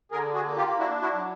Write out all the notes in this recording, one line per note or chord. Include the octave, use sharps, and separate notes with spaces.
D3 G#4 A#4
F#4 G#4
A#3
F4 G4
D4 E4 F#4
E4 F#4
F#3